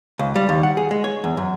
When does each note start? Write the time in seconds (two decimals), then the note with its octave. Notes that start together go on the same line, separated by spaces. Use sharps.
0.19 C#2
0.36 G3
0.49 D#2
0.63 F#5
0.77 G#4
0.91 G#3
1.04 C#5
1.24 E2
1.37 F#2